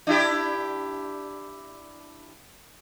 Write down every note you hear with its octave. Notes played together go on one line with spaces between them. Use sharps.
D4 E4 G4